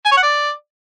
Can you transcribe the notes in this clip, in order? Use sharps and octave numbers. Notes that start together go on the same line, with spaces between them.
G#5
C#5
F#5
D5